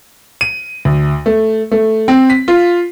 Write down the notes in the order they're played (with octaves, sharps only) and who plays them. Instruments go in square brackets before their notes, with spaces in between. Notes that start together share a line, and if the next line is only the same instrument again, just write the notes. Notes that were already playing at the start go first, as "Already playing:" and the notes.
[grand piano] D#7
D2
A3
A3
C4
B6
F4